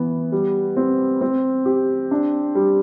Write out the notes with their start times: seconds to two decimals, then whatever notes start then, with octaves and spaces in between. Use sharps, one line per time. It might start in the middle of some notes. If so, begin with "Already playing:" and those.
Already playing: E3 B3
0.32 G3
0.77 C4
1.21 C4
1.66 G4
2.11 D4
2.55 G3